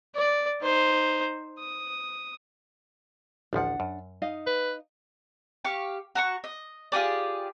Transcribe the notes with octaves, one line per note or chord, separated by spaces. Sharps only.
D5
D#4 C5
D#6
A1 D2 F3 D4 F#5
F#2
D#4 D#5 F5
B4
G4 F5 C#6
F#4 A#5 C#6
D#5
F4 G4 G#4 D5